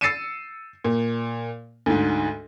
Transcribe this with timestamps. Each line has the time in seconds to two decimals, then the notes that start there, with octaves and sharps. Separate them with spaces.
0.01 E6 A6 C7 C#7 D#7 E7
0.84 A#2
1.86 D2 G#2